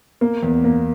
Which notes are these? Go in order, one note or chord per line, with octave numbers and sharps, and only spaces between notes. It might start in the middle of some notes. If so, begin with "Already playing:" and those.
A#3
E2
A#3